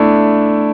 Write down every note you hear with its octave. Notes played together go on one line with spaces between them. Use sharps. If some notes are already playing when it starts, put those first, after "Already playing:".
Already playing: A3 D4 E4